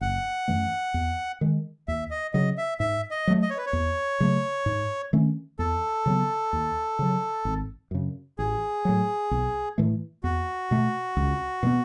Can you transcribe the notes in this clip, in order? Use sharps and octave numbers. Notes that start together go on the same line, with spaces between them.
F#1 F#5
F#2 E3 A3
E2
D#3 G#3
D#2 E5
D#5
C#3 F#3 D#5
E5
G#2 E5
D#5
F#3 A3
D#5
C#5
B4
C#5
E2
C#3 F#3 A3
G#2
D#3 A3 C#4
E2 A4
C#3 F#3 B3
D#2
C#3 F#3
G#1
F#2 C#3
A1 G#4
A2 F#3
B1
A2 E3 A3
E2 F#4
B2 A3
C#2
B2 F#3 B3